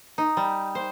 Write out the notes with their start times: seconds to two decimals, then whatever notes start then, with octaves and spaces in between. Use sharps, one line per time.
0.18 D#4
0.37 G3
0.75 C5